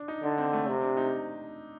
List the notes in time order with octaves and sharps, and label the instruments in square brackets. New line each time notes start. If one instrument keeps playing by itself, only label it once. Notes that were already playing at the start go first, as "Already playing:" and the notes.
Already playing: [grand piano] D4
D#4
[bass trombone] D3 [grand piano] D4
[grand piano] C4
A3
[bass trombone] C3
[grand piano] D4
D#4